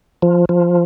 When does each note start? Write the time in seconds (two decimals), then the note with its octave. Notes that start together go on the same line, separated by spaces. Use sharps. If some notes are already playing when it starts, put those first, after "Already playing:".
0.22 F3
0.49 F3